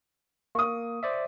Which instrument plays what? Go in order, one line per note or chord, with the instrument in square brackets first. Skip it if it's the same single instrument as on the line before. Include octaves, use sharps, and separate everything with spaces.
[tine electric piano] A#3 [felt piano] C#6 D#6
[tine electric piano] C5 D5 E5